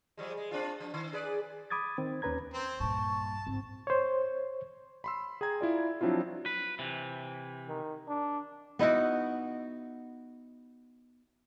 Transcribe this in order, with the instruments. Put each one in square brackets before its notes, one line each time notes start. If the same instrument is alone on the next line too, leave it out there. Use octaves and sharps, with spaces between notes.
[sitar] F3 G3 G#3
G#3
C4 D4 F4
F3 D4
D#3
G#4 B4 D5
[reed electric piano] B5 D6 D#6 G#6 A6
D#3 C4
D#2 C#4 B4 A#5 G#6
[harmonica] C4 C5
[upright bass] G2 A#2 [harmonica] A5 [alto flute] C#6
[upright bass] G#1 G3 [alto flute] C4
[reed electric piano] C5 C#5
[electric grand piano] B5 C6 E6
G#4 G5 A#5 G#6
E4 F4 D5
F3 F#3 C4 D4 E4 F4
[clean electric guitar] B4
C3 E3
[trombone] D#3
D4
[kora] B3 D#4 E4 F#4